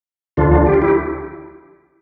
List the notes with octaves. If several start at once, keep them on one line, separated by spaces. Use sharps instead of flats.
D2 D3 F3 D4 F4
G4
F4
E4 G4